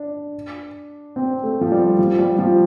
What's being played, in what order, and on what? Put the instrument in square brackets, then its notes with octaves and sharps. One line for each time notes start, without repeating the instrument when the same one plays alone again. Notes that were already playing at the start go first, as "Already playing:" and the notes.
Already playing: [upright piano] D4
C4
A3
F3
G3
F3
G3
F3